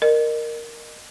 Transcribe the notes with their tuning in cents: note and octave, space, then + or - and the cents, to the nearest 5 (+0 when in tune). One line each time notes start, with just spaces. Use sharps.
A#4 +0 D#5 -35